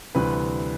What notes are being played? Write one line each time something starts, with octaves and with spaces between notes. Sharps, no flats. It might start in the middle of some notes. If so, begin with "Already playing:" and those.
D2 C3 E3 G3 B4